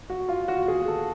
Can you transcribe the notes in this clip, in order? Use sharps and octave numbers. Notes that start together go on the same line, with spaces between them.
F#4
F4
F#4
G#4
A4